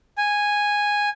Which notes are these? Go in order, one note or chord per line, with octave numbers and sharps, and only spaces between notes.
G#5